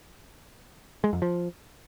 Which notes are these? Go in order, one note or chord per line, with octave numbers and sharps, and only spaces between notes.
G#3
F2
F3